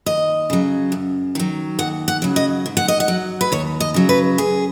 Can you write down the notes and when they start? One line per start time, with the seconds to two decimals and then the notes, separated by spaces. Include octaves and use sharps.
0.06 D#2 D#5
0.50 C#3 F#3
0.92 F#2
1.35 D#3 F#3
1.79 D#2 F#5
2.08 F#5
2.22 C#3 F#3
2.36 D#5
2.66 G#2
2.77 F#5
2.88 D#5
3.00 F#5
3.08 F#3
3.41 B4
3.52 D#2 C#5
3.80 D#5
3.94 C#3 F#3
4.09 B4
4.38 F#2 G#4